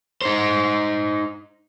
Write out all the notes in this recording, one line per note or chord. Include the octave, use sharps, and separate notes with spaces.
D#4 C5